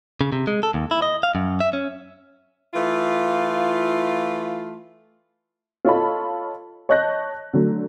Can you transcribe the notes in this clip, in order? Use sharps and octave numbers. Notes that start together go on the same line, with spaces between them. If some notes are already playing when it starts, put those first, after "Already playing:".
C#3
C3
G#3
A4
D#2
E4
D#5
F5
F#2
E5
C#4
E3 A3 F4
F4 A4 C#5 D#5 A5 B5
C#5 D#5 A5 F#6 G6 A#6
D3 F#3 A3